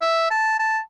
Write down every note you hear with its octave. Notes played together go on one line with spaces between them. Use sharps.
E5
A5
A5